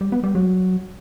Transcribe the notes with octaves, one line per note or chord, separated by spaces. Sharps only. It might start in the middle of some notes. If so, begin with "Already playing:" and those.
G3
B3
G3
F#3